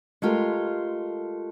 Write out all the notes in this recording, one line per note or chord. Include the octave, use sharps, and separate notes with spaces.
G#3 A3 F4 G4 A#4